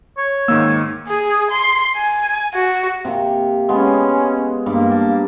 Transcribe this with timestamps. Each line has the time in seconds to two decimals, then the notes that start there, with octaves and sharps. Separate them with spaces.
0.18 C#5
0.48 G#2 D#3 A#3 E6
1.08 G#4
1.51 C6
1.97 G#5
2.54 F#4
3.05 C3 A#3
3.69 G#3 B3 C#4
4.66 G2 A#3 B5 D6
4.91 A5